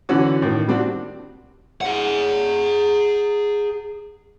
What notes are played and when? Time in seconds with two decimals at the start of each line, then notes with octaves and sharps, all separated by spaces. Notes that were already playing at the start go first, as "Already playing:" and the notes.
0.09 D3 E3 C#4 F#4
0.42 A2 D#3
0.68 G3 C4 D4 F#4
1.81 G#4 F#5